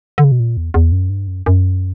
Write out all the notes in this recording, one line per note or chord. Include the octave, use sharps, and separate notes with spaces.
D3
C#3
B2
A#2
E2
E2
F#2
G2
F#2
F#2